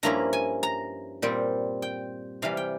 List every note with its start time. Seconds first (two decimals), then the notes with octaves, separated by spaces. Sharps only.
0.03 G2 F3 A#3 C#4 E4 A#5
0.33 G#5
0.63 A#5
1.22 A#2 G3 C4
1.82 G5
2.42 C3 E3 G3 F5
2.57 G5